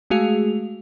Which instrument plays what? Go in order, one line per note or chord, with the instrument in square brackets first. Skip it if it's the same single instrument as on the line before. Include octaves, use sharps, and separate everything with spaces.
[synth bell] G#3 A3 F#4 G#4 F5 F7